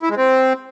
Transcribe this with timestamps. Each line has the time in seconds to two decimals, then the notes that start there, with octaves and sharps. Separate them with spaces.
0.03 E4
0.10 G#3
0.17 C4